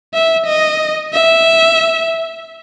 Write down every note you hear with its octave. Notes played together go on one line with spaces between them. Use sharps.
E5
D#5
E5